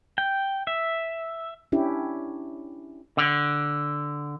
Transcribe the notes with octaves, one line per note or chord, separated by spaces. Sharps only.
G5
E5
C#4 D4 E4 G4
D3